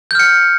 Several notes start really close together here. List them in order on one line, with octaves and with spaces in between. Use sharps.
G6 F6 C#7